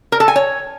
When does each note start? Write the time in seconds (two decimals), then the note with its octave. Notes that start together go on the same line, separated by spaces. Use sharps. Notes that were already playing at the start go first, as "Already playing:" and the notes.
0.12 A#4
0.20 A4
0.28 G#5
0.36 C#5